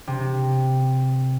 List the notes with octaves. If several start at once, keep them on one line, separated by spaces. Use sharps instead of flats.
C3